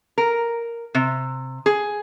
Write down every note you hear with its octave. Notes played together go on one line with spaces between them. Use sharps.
A#4
C3
G#4